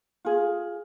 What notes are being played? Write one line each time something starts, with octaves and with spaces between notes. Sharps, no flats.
F4 G#4